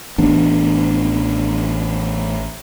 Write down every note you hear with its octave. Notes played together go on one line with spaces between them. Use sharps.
A1 E3 B3 D4